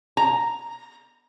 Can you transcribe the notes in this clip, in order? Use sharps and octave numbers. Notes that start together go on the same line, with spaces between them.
A#5